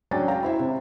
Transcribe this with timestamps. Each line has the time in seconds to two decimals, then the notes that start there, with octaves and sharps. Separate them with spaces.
0.11 F#3 C#4 D4 G5 G#5 A6
0.28 F5 G5 A#5
0.43 E4 C5 E5
0.59 C3